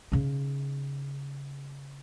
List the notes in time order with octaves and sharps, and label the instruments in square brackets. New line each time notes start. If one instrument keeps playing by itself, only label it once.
[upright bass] C#3 D#4